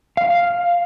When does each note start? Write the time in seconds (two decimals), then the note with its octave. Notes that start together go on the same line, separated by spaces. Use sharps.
0.17 F5